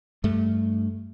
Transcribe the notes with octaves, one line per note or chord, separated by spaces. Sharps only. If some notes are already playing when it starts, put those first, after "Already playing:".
G2 A3